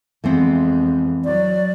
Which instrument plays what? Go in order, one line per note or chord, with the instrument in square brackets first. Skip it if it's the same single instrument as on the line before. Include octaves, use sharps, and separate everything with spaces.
[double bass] F2 G#3 [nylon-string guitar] E3 B3 C4
[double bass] F#3 [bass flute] D5